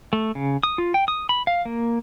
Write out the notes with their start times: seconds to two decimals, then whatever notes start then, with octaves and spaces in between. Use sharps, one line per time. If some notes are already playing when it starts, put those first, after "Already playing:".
0.13 A3
0.35 C#3
0.63 D#6
0.78 F4
0.94 G5
1.08 D#6
1.29 B5
1.47 F5
1.65 A#3